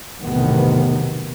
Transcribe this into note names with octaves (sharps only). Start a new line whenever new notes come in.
B1 E2 A2 C3 D#3 B3